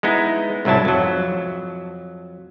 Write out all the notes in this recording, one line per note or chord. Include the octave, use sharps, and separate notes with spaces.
G#3 B3 D#4 E4
C2 G#2 F#3 E4 A5
F2 F#3